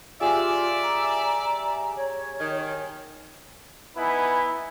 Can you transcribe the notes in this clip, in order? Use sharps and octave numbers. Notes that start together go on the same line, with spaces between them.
F4 G4 G#4 D5 E5
A#5
C#5
D#3
B3 D#4 E4 B4 G#5